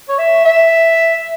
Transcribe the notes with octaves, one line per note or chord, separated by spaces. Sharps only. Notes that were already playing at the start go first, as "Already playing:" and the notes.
C#5
E5
E5